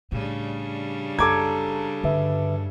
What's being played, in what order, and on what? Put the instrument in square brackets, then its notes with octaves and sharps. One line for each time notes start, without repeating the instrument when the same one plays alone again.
[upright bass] A2 [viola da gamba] C#3 G3 D4
[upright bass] F#1 [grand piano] A4 D6 G#6 [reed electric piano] A#5
[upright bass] G2 [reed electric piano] D3 B4 E5